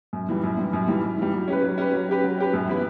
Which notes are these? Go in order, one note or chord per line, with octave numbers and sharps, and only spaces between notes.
F#2
E3 G3
F#2
E3 G3
F#2
E3 G3
F#2
E3 G3
F#3
C#4 G4 B4
F#3
C#4 G4 B4
F#3
C#4 G4 B4
F#3
C#4 G4 B4
F#2
E3 B3 E4 B4